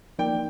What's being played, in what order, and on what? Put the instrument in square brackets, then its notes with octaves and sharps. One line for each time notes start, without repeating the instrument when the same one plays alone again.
[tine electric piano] F3 A#3 D#4 A#4 D5 [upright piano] G5